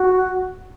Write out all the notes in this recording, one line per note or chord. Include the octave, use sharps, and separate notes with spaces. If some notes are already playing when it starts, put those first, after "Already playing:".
Already playing: F#4